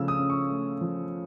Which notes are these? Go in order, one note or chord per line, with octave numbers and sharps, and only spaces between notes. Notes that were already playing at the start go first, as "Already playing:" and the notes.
Already playing: C#3 F3 A3 E6
D#6
C#4
C#6
A3
F3